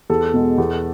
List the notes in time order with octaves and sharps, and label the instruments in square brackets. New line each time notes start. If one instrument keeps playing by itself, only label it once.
[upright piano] E2 A4
B2 G#3
E2